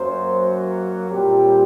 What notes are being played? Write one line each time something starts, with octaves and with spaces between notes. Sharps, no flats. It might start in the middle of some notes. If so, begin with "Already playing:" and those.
Already playing: F#2 F#3 A#3 C5
A#2 G3 C4 G4